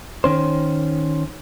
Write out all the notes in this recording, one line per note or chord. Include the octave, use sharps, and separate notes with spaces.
D#3 C#4 C5